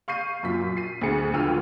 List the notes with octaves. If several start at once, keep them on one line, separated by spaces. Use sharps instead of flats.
F5 C#6 G6 C7 D#7
F#2 A#2 B6
C7 D#7
D2 G#4 C#7
C#2 D3 G5 E6 F6 D#7